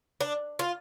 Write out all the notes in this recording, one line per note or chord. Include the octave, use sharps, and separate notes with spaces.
D4
F4